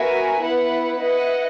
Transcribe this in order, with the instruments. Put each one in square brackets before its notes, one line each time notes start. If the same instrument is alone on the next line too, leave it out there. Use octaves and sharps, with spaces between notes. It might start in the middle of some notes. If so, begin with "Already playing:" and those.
Already playing: [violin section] B3 F#4 A#4 E5 G#5
B3 E4 B4 F#5
E4 B4 D#5 F#5